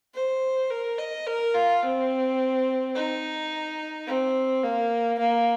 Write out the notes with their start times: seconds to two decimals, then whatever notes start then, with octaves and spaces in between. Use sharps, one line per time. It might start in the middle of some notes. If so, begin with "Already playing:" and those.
0.14 C5
0.71 A#4
0.99 D#5
1.27 A#4
1.54 F4
1.83 C4
2.95 D#4
4.07 C4
4.64 A#3
5.19 A#3